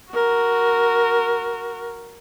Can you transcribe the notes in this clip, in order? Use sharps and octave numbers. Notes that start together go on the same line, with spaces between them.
F#4 A#4